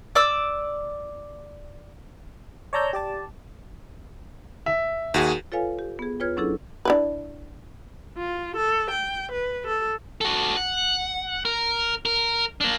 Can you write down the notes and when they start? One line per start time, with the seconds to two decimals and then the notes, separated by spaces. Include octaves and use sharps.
0.15 D5 D6 E6
2.73 C#5 D5 A5 A#5 E6 G6
2.93 G4 D5 A5
4.66 E5
5.14 D#2 F#4 G#4
5.52 F4 A4 B4 C#5 F5 G#5
5.79 G4
5.99 B3 G#4
6.20 E2 F4 B4 C#5 F6 G#6
6.37 F#3 C#4 D4 E4 G#4 A4
6.85 D4 E4 B4
8.18 F4
8.57 A4
8.91 G5
9.32 B4
9.67 A4
10.21 F#4 A4
10.57 F#5
11.45 A#4
12.05 A#4
12.61 A#3 D4